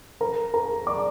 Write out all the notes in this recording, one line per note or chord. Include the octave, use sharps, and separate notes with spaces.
A#4 A#5
A#4 A#5
D5 D6